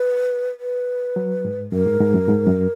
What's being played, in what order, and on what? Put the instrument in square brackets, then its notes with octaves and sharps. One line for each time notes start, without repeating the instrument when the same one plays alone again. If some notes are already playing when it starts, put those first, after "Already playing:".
Already playing: [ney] B4
B4
[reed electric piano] F#3
G#2
[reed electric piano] F#2 [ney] A#4
[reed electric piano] G#2
G#2
F#2
G#2
F#2